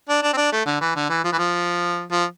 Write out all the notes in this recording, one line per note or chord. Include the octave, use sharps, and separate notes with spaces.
D4
D4
C4
D4
A3
D3
E3
D3
E3
F3
E3
F3
F3